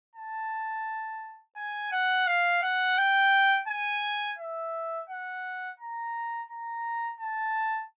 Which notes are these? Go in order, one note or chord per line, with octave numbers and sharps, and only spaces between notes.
A5
G#5
F#5
F5
F#5
G5
G#5
E5
F#5
A#5
A#5
A5